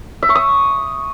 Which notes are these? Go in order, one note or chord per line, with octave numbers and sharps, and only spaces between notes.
E5
C#6
D#6